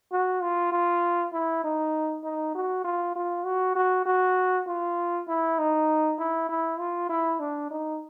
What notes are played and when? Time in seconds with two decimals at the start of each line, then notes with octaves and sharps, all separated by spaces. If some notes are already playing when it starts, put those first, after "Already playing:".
0.12 F#4
0.42 F4
0.72 F4
1.33 E4
1.64 D#4
2.24 D#4
2.55 F#4
2.84 F4
3.15 F4
3.45 F#4
3.76 F#4
4.06 F#4
4.67 F4
5.28 E4
5.59 D#4
6.19 E4
6.49 E4
6.79 F4
7.10 E4
7.40 D4
7.71 D#4